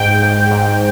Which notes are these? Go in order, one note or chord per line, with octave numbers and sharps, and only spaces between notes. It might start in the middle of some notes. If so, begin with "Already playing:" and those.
Already playing: G#2 G5
G#2
G#2